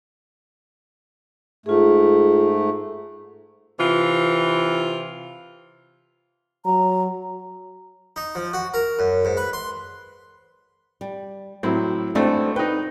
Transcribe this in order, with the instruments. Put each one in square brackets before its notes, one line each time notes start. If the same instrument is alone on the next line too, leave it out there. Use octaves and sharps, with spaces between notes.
[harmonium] G#2 A3 [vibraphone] F4 G#4
[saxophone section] C3 E3 F4
[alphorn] F#3 [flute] A#5
[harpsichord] D#4
F3
F#4
A#4
F#2
G#2
B4
C6
[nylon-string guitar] G3
[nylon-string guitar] A2 [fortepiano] F#3 C4 E4
[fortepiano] G#1 A3 C5 [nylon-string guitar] B3 C4 D4
[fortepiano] D#4 B4 [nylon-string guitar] G5